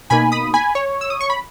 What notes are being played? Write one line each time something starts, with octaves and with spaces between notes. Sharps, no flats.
B2 A#3 D#4 G#5 B5
B5 D#6
G#5 B5
C#5
E6
D#6
C#6
B5